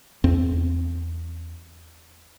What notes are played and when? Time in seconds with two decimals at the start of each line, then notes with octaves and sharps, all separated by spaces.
0.24 E2 C4